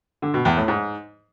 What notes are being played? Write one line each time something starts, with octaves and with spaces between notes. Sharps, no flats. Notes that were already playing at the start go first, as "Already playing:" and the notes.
D3
B2
E2
A2
G#2